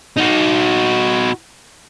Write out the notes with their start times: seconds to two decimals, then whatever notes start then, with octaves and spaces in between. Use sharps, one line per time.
0.17 D#4 F#4